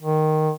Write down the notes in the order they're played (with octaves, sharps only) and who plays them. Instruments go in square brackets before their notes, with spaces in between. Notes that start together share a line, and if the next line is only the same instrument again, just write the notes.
[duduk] D#3